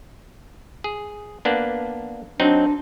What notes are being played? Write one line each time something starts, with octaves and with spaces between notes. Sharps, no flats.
G#4
A#3 B3 D4
F#3 C4 D4 D#4